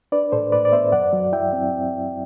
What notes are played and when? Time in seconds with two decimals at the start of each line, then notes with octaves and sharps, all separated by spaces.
0.12 D4 B4 D5
0.32 A2 A4 C5
0.52 A2 B4 D5
0.65 D5
0.72 B3 C5 E5
0.92 F#2 D5 F#5
1.13 F#3
1.32 E4 E5 G5
1.53 C4